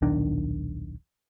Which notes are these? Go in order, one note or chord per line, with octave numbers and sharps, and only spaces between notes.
D#1 B1 D#3 D4